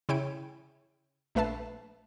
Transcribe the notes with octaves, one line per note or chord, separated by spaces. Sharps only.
C#3 E4 C#5 G5 G#5 D7
A#1 A3 B4 E5 A5 C7